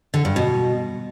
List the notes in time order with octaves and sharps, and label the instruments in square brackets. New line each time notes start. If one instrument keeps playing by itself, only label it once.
[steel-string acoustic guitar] D3
G2
B2